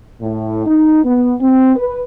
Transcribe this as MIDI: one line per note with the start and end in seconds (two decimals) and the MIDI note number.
0.21 0.64 45
0.66 1.01 63
1.04 1.34 59
1.41 1.73 60
1.76 2.01 71